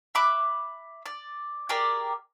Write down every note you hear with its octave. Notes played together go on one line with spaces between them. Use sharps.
E5 B5 D6 F#6
D5
G4 G#4 A#4 D5